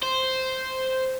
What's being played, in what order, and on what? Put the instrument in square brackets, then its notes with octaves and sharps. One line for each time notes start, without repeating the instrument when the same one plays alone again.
[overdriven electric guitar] C5